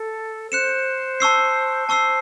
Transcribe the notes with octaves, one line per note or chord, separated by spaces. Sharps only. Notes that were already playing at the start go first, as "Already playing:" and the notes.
Already playing: A4
C5 F#6 C#7 E7
A5 C#6 E6 C7
C5 A5 C#6 E6 C7